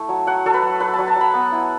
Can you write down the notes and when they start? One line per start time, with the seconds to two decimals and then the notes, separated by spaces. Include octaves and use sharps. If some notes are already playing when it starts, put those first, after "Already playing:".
Already playing: A3 E4
0.09 F#3
0.27 F#3 F#5
0.45 F#3 A4
0.54 B4
0.62 F#3
0.80 F#3 B4
0.93 A5
0.99 F#3
1.08 A5
1.16 F#3 B5
1.34 B3
1.52 E4